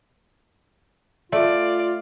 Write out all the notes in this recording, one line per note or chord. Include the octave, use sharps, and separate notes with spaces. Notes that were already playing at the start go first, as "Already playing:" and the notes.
A3 F4 D5